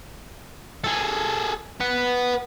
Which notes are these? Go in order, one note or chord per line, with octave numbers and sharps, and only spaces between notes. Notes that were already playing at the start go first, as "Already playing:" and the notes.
G#4 A4
B4 F#5